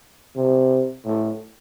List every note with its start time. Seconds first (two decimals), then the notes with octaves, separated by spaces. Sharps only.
0.36 C3
1.05 A2